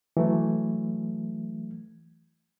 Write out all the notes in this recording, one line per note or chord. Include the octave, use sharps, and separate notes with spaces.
E3 F#3 A3